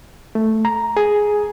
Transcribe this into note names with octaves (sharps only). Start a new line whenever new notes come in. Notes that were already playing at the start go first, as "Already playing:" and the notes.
A3
A#5
G#4